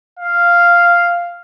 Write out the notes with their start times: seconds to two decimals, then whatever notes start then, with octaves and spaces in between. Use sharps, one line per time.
0.19 F5